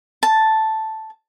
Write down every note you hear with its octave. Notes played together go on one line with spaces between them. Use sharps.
A5